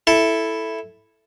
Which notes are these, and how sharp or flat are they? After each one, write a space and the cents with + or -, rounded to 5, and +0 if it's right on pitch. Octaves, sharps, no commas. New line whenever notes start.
E4 +0 A4 +0